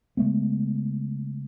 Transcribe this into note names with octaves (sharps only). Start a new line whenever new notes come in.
C#3 G#3 A3 B3